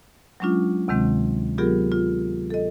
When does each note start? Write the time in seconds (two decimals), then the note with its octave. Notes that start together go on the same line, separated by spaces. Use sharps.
0.40 F#3 G#3 C#4 D4 F4
0.88 D2 C3 D#3 G#3 C4
1.58 F#3 B3 F4 G4 G#4 A#4
1.92 F4
2.50 A4 D#5